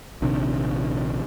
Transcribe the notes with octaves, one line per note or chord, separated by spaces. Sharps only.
A#1 C3 D#3 D4